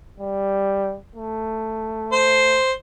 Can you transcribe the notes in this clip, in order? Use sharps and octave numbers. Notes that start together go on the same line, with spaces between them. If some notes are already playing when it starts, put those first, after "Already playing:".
G3
A3
C5